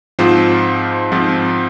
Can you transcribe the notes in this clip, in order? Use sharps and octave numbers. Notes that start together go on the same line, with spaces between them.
G#2 F3 C4 F4 C5
G#2 F3 C4 F4